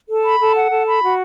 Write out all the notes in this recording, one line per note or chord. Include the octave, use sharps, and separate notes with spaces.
A4
B5
A4
F#5
A4
B5
F#4